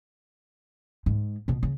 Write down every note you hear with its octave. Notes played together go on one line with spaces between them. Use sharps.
G#2
A#1 B2
C#3